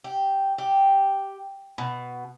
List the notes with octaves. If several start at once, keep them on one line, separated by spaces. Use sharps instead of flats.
G4
G4
B2